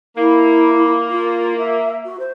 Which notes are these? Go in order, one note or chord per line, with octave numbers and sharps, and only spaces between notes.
A#3 E4
F4
E5
F#4
C5